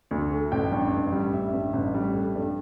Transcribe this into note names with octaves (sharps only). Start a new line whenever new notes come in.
D2
A3
A1 G5
G2
A1
G3
A1 E5
G2
A1
G3
A3
G2